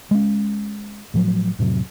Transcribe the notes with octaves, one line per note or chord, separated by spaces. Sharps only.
G#3 C#4
A2 F3 F#3
F2 A2 C3 F#3